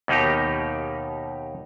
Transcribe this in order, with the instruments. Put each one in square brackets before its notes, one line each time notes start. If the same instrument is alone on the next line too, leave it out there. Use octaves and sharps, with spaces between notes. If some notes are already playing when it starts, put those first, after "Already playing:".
[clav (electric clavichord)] D#2 B2 A#3 D#4 G4